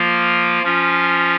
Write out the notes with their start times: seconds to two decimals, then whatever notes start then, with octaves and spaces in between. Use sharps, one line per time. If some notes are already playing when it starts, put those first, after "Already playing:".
Already playing: F3 A#3 F4
0.63 F3 C#4 F4